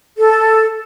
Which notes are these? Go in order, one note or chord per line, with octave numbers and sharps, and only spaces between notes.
A4